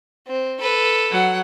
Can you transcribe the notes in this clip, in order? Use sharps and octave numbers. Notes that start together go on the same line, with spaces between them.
C4
A4 B4
F#3 F#5